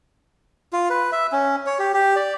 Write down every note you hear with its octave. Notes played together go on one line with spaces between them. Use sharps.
F4
B4
E5
C#4
C#5
G4
G4
D5